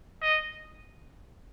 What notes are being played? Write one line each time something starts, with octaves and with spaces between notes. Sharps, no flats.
D#5